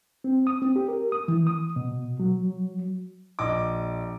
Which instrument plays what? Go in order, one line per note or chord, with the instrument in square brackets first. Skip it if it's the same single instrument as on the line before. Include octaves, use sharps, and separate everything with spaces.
[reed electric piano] C4
D#6
C4
G4
A#4
D#6
E3
D#6
B2
F#3
[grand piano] A#1 D#5 D6